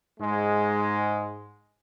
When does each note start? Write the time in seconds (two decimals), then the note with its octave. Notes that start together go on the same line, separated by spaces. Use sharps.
0.19 G#2 G#3